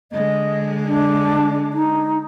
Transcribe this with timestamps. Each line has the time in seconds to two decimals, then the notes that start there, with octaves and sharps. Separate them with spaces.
0.12 D3 G#3 D#5
0.86 D4
1.74 D#4